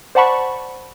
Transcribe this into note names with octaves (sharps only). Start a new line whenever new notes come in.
C5 D5 F#5 A5 B5 C#6